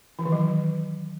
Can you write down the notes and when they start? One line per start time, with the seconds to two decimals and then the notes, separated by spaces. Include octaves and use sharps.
0.19 E3
0.25 D#3
0.32 F#3